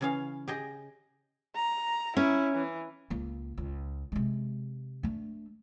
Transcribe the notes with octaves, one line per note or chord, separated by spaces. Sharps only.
C#3 E3 C#4 G#4 F5
G4 G#4 D#5
A#5
C#4 E4
E3
C#2 A#3
C#2
C3 G#3
A3 D4